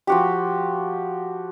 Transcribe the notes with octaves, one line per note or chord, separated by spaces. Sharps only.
F3 F#4 G4